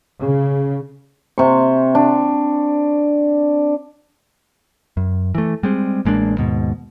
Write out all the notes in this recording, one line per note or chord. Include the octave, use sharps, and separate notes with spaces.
C#3
C3 C#6
D4
F#2
E3 A3
G3 G#3 C4
A1 G#3 A#3 D4
D#2 G#2 B2